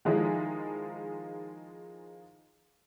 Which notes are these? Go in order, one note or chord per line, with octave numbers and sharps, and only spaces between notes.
D#3 F3 G#3 D#4 E4 G#4